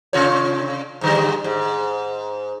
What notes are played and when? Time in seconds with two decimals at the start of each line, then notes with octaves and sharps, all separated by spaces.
0.13 C3 F4 C#5
1.01 G#2 D3 G3
1.44 G#2